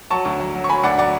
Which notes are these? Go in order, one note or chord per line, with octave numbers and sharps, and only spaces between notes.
F#3 A5 C#6
D2
F#3
F#3
C#6
F#3 G#5 B5
D2 D5 F#5
F#3 D5 F#5